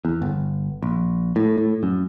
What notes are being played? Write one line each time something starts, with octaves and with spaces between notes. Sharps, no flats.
E2
G1
A#1
A2
A2
F#2